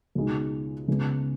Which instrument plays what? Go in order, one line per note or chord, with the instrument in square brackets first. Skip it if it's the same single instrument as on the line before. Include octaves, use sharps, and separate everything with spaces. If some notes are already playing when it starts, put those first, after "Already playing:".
[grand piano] C#2 B2 G#3 D#4
C#2 C#3 G#3 B3